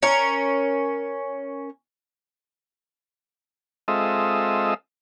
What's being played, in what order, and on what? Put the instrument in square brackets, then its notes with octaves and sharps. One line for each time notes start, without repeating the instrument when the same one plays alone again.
[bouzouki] C#4 A#4
[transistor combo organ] G#3 C4 F4 A4 D#5 E5